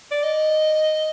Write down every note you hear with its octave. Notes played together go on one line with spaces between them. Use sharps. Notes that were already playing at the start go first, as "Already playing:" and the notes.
D5
D#5